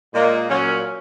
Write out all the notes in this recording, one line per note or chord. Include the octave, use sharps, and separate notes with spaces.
A#2 G#3 A#3
A#2 F#3 C#4